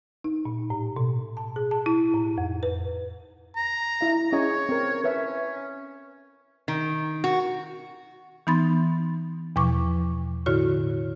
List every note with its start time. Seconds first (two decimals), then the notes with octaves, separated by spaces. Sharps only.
0.24 D#4
0.45 A#2
0.70 A2
0.96 B2
1.37 A5
1.56 G#4
1.71 A5
1.86 E4
2.14 A2
2.38 F2
2.63 B4
3.56 A#5
4.01 E4 D#5 F5
4.32 C#4 G#4 C#5 D#5
4.69 C4 A#4
5.04 C#4 B4 C#5 E5
6.68 D#3
7.24 F#4
8.47 E3 B3 D#4 B5 C6 A6
9.56 E2 B2 F3 C#6 D6
10.46 A2 D3 E4 F#4 C#5 F6